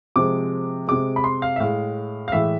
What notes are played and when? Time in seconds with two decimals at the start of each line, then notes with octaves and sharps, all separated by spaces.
0.16 C3 F3 G#3 D6
0.88 C3 G#3 D6
1.16 B5
1.24 C6
1.42 F5
1.56 E5
1.60 A2 G#3 F5
2.28 F5
2.32 A2 E3 G#3 E5